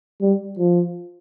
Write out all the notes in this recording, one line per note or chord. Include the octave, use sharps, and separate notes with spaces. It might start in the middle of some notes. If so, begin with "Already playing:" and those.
G3
F3